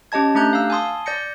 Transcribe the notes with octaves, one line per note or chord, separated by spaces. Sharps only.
C#4 G4 D#5 A5 G#6
A3 D4 G4 A#5 F#6 G6
F5 E6
G#5 A5 C6 D#6
D5 G6 A#6 C#7